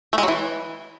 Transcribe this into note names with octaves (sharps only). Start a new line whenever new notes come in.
A3
G#3
F#3
E3